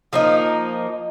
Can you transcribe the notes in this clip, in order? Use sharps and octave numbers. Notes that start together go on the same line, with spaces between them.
F3 A#3 D#4